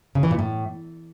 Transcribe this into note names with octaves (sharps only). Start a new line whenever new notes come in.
C#3
E3
A#2
A2